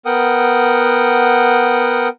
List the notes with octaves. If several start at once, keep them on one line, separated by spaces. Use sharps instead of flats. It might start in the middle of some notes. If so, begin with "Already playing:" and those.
B3 A#4 F#5 G5 D#6